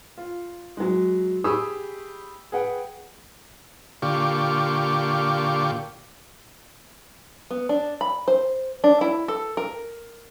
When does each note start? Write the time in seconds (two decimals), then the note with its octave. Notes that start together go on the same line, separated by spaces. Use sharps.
0.17 F4
0.77 F#3 G#3
1.44 G4 G#4 B5 C#6 D#6 E6
2.52 G#4 B4 F#5 G5
4.02 A#2 D3 F4 G4 C#6 D6
7.51 B3
7.69 D4
8.01 B5
8.28 C5
8.84 D4
9.01 E4
9.28 A4
9.57 A#4